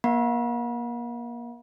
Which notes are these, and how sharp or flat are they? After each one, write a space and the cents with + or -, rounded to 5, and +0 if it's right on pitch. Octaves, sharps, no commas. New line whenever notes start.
A#3 +30 F#5 -40 B5 -40